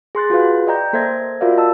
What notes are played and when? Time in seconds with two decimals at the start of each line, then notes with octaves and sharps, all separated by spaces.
0.15 G#4 C6 F#6 A6
0.30 F4 F#4 G#4 B4 F5
0.67 D5 D#5 G5 A#5 G6
0.93 A#3 A4 C5 E5 G#6 A#6
1.41 F4 F#4 A#4 D5 E5 F5
1.57 D#5 A5 E6